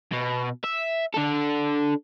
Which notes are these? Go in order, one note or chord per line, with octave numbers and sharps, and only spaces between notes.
B2
E5
D4 A4